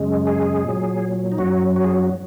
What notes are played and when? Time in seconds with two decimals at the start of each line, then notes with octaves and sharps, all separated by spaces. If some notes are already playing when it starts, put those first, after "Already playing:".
Already playing: F#2 C#3 G#3
0.27 G#4
0.64 A#2 F#3
1.32 D#4
1.38 F#2 F#3 F#4
1.76 F#4
1.84 G#4
1.94 F#4